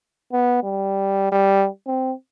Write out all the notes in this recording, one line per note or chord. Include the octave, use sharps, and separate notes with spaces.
B3
G3
G3
C4